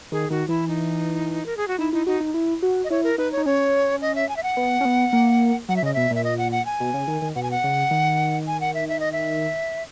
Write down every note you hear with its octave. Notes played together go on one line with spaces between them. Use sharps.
D#3 G#4
D#3 F#4
E3 E4
D#4
A#4
G#4
F#4
D#4 E4
D#4 E4
D#4 F#4
D#4
E4
F#4
D#5
E4 C#5
A#4
D#4 B4
C#5
D#4
C#4 C#5
D#5
E5
G#5
E5
F#5
B3
C#4
B3
A#3
F#3 F#5
E5
C#3 D#5
B2 E5
A#2 E5
D#5
F#5
F#5
G#5
B2
C#3
D#3
D#3
B2 F#5
G#5
F#5
C#3
D#3
G#5
F#5
E5
E5
D#5
E5